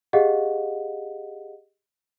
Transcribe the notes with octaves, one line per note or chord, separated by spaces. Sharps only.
G4 G#4 D#5 F5 F#5